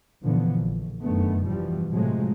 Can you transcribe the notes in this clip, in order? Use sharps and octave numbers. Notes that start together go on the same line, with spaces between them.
F#2 A#2 D3 E3 F3 B3
A#1
F1 F#2 D3 D#3 A3 B3
G2 B2 E3 F3 G3
A2 C3 F3 F#3 G#3 A3